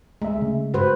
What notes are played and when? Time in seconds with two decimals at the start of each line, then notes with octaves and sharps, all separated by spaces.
0.22 D2 G#3 A3 E5
0.42 C#3
0.74 G2 F#4 B4 C5